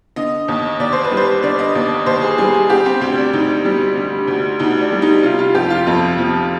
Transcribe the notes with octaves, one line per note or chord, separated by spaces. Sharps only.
D3 D#5
D#2
D#2 D5
C5
B4
G3
C5
D3 D5
D#5
D#2 D5
D#2 C5
G#4
G3 G#4
G#4
D3 G4
C4
D2 C4
D4
D2 D#4
G3
D3
D2
D2 D#4
D4
G3
D#4
C3 F4
F4
F2 G4
F4
F2
F3